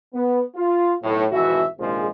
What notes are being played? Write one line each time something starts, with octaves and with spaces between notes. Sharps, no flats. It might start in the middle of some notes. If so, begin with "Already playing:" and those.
B3
F4
B1 A2
G#1 F2 B2 E3 F#4 E5
A#1 C3 D#3 F3 G#3